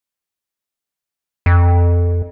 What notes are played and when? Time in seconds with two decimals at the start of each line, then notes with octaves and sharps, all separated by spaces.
1.46 F2